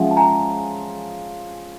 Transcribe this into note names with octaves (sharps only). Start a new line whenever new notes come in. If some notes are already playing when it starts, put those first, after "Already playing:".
Already playing: F3 G#3 C#4 E5 F#5
A5
G#5 A#5